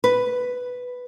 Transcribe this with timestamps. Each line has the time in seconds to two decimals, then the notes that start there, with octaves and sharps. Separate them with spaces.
0.04 B4